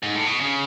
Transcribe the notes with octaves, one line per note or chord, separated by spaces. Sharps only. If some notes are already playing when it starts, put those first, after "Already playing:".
G#2
A2
B2
C#3